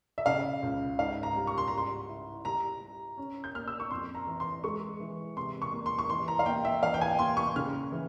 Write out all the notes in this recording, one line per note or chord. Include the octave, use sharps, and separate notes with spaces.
E5
C#3 F5
C#2
G#2 F5
A#5
G3
C#6
C6
A#5
G3 C6
E4
G3 A#5
G3
C#4
G6
A#3 F6
E6
C#6
F2 C6
A#5
E3
C6
G#3 C#6
E3
C3 C6
C#6
A#3
C6
C#6
E3 C6
A#5
F5
A#3 G5
E5
E3 F5
G5
G#5
A#3 C6
C#6
C#3 F6
E3